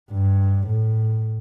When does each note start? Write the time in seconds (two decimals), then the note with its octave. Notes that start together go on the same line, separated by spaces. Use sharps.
0.12 G2
0.67 A2